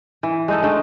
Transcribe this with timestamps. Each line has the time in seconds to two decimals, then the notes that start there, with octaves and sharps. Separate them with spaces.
0.23 E3
0.48 G#3 D#4 A4
0.63 D3 G#3 A3